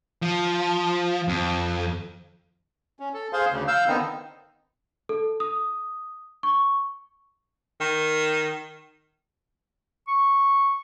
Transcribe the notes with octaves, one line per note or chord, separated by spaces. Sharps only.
F3
F2
C#4
A4
G#4 C5 F5 C6
D2 C#3
F5 E6 G6
D3 D#3 B3 C4 D#4
A4
D#6
C#6
D#3
C#6